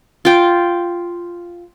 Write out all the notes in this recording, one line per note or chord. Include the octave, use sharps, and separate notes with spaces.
F4 G5